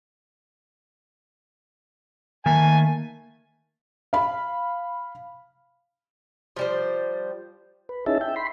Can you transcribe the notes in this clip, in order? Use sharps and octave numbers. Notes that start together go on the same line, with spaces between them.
D#3 A3 A#3 G#5
F5 B5
F3 G3 C5
B4
C#4 D#4 E4 G#4 E5 A5
E5 G5
B5 C6